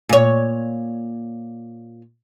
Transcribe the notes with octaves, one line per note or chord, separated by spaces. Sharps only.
A#2 C#5